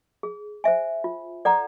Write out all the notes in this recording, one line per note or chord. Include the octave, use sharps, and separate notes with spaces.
G#4
C5 E5 G#5
F4
A4 D5 F#5 A#5